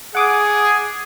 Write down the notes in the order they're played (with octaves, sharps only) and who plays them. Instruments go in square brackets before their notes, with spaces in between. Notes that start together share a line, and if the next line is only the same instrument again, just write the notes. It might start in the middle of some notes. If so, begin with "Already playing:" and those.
[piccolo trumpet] G#4 [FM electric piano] F#5 D6 D#6